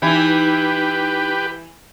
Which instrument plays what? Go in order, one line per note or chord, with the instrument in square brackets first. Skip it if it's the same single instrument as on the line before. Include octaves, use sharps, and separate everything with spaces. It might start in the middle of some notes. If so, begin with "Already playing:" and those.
[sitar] E3 E4 [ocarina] D#4 [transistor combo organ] G4 B4